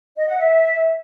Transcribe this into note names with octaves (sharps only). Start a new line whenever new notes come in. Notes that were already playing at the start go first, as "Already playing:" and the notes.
D#5
F#5
E5